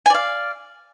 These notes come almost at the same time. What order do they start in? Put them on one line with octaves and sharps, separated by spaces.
G#5 D5 F5